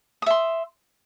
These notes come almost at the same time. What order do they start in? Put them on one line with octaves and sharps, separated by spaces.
D#6 E5 C6